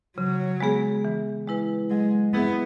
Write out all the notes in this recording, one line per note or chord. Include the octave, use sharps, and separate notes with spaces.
C#3 F#3
G#3 B3 G#4
E3
G#3 E4 B4
F#3 G#3
B3 E4 G#4 B4 E5